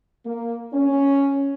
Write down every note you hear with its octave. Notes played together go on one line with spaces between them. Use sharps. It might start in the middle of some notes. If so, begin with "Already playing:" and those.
A#3
C#4